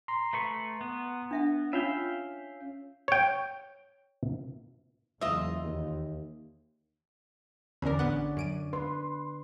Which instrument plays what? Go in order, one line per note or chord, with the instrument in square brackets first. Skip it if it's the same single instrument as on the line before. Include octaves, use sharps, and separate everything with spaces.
[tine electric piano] A#5 C6
[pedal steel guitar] A3 B4 C#6
B3
[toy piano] D4 E5 F#5
[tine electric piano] C#4 [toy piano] F4 [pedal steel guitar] E5 F5 G5
[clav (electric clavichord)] C#5 G5
[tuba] F#1 [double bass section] E2 [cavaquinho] F4 D#5 [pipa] E5
[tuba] D#2
[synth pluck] E2 A#4 [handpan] D3 D5 [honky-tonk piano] C#4
[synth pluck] A1 B3 F#5
F#2 D7 D#7
[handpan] B4 [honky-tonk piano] C6